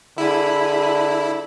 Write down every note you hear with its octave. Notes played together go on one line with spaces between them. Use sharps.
D3 E4 G#4 B5